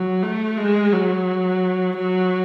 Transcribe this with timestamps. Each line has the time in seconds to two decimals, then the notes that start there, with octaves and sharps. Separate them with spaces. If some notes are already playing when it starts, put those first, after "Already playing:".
Already playing: F#3
0.23 A3
0.58 G#3
0.93 F#3
1.98 F#3